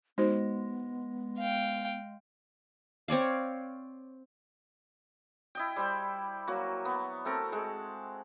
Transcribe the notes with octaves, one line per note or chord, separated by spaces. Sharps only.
G#3 B3 D#4 F#4 C5
F5 G5
C4 C#5 D5 F5
E4 D#5 G5
G3 C5 D5 G5
F#3 A#3 F#4
B3
A3 C4 A4 A#4
G#3 F#5 A5